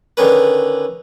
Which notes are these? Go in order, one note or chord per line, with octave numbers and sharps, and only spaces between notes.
D3 D#3 C#4 B4